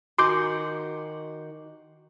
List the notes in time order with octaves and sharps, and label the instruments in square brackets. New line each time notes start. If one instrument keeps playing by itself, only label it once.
[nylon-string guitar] D#3 F#4 G#5 [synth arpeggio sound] C6 D6 G6